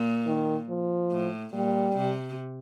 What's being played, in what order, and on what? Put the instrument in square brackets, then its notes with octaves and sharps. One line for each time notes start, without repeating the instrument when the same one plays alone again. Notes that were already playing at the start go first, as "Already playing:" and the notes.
Already playing: [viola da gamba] A#2
[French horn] D#3
F3
[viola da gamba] A2
[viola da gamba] A#2 [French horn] G3
[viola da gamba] C3